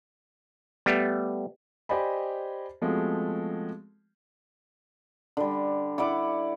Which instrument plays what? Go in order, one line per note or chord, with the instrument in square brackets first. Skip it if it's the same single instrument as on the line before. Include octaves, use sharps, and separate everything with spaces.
[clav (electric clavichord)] G3 A3 B3
[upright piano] G4 C5 D5 D#5 G#5 B5
F3 G#3 A3 B3 C4 F#4
[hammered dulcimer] D3 G3
E4 D5 F#5 D6